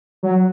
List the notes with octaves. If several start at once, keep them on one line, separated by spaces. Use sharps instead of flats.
F#3